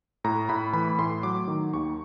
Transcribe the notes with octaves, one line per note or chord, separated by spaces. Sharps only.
A2 A#5
A2 B5
E3 B5
A2 C6
F#3 D6
D#3
D#2 C#6